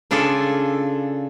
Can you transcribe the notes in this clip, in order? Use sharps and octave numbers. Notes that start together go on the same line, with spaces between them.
C#3 D4 F4 G#4 A4